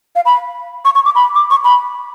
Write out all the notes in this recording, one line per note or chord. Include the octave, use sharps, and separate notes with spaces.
F5
B5
C#6
C#6
D6
B5
D6
C#6
B5